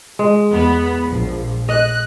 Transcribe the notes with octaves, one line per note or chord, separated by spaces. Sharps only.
G#3
E2 B3 B5
A#1 F3
D#5 F#6